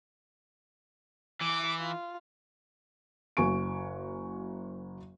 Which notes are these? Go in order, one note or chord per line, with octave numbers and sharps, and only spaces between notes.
E3 D6
F4
F#1 F#4 G#5 C#6 D7